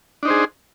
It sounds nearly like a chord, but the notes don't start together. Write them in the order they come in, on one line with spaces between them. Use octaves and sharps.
D4 D#4 C5 G#4